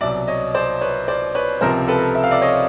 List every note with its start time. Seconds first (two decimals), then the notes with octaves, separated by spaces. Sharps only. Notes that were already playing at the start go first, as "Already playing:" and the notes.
0.01 C2 B2 F#3 D5 E5
0.27 C#5 D#5
0.54 C5 D5
0.81 B4 C#5
1.08 C5 D5
1.35 B4 C#5
1.61 C#2 C3 F3 A#4 C5
1.88 A4 B4
2.15 E5
2.24 F5
2.31 D5 E5
2.42 C#5 D#5